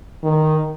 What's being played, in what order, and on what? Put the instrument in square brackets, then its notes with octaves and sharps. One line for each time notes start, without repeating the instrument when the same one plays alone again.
[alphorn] D#3